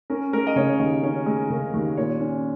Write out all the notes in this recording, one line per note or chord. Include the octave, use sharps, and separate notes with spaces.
C#4 A#4
G#3 A#4
D#5
C#3 C#5
D#2 D#5
C#4 C#5
G#3
C#3 A#4
D#2
A#2 C#5
C#4